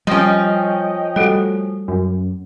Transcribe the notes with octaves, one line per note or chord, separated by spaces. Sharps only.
F3 G3 C#4 D#5 G5
G3 A3 F#4 A4
F#2